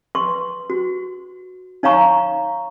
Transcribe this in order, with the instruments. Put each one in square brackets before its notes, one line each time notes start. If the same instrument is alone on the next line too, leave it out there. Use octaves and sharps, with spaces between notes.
[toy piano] B4 C6 C#6
F#4
D#4 C#5 F5 A#5 C#6